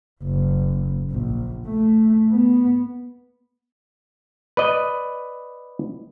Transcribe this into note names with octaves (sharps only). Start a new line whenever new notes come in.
F#1
A#1
A3
B3
B4 D5 D#5